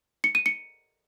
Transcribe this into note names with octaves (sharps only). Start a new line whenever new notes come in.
C#7
D#7
C#7